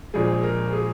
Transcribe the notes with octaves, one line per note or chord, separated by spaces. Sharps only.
A#1 A#2 F3 G#3 G#4
A#4
G#4